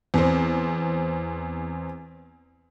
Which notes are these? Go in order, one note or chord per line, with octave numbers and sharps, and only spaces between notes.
E2 C4